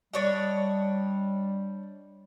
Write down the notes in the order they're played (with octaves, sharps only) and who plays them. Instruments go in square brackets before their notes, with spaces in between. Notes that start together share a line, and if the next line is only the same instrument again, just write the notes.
[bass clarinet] G3 [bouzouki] D4 C#5 D#5